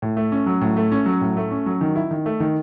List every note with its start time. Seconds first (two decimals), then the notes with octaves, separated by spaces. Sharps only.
0.02 A2
0.17 A3
0.32 C#4
0.46 F#3
0.61 A2
0.77 A3
0.92 C#4
1.06 F#3
1.21 A2
1.37 A3
1.51 C#4
1.66 F#3
1.81 D#3
1.96 E4
2.11 D#3
2.26 A3
2.40 D#3